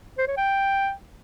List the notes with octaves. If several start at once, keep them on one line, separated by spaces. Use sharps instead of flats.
C5
C#5
G5